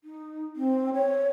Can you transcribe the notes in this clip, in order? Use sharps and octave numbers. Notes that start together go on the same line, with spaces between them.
D#4
C4
C#5